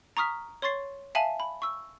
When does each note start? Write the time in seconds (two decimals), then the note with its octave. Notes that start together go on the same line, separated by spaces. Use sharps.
0.17 A#5 C#6 D#6 F6 B6
0.62 C#5 C6 C#6 A6 C7
1.15 E5 F5 G#5 A5 D#7 F#7
1.40 B5
1.62 C#6 E6